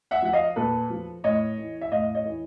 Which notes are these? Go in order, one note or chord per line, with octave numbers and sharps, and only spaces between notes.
E5 F#5
F3 F#5
D#5 F5
A#2 A4 B4
F3
A2 C#5 D#5
E3
E5
A2 D#5 F5
C#5 D#5
E3